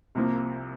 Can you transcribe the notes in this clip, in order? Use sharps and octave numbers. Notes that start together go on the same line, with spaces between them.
C2 C3 F3 A#3